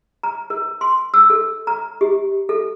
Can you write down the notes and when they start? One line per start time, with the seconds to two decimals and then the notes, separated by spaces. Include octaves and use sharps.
0.23 A#5
0.50 A#4
0.81 C6
1.14 E6
1.30 A4
1.67 A#5
2.01 G4
2.49 A4